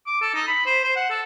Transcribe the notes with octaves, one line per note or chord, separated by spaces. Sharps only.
D6
A4
D#4
B5
C5
C5
F#5
A4